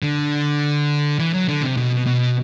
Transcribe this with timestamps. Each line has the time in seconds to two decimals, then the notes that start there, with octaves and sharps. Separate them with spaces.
0.03 D3
1.19 E3
1.33 F#3
1.48 D3
1.63 C3
1.77 B2
2.06 B2